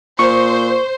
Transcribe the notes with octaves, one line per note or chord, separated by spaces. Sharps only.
A#2 C5 C#6